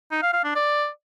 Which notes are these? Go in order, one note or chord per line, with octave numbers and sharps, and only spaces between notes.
D#4
F5
F5
D4
D5